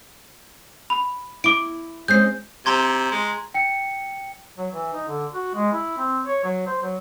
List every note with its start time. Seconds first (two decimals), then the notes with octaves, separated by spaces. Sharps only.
0.90 B5
1.44 E4 D6 D7
2.08 G#3 C4 C#4 G6 C7
2.66 C3 A#5 C6 G#6
3.12 G#3
3.54 G5 C#7
4.58 F#3
4.74 E3
4.93 D#4
5.08 D3
5.34 F#4
5.55 G#3
5.72 E4
5.98 C4
6.26 C#5
6.44 F#3
6.66 C5
6.82 F#3